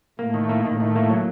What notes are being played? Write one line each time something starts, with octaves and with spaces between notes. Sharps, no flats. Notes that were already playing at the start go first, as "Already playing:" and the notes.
A2 A3 A#3
D#3
A#3
A2 D#3 A3
D#3
A#3
F#3